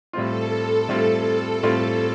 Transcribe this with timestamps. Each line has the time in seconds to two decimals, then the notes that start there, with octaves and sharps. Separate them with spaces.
0.13 A2 G3 C4 F4 A4
0.89 A2 G3 C4 F4
1.63 A2 G3 C4 F4